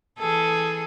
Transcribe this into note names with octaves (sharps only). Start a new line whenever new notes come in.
E3 G#4 A4